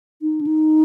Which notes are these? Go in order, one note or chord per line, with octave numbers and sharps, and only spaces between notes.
D#4
D4
D#4